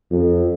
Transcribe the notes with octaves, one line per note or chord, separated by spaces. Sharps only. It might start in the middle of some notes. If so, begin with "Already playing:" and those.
F2